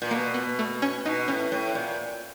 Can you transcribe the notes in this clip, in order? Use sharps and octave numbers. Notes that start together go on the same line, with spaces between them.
A#2
B2 A#3
B3
A3
C#4
B2 D#4
A2 C#4
A2
A#2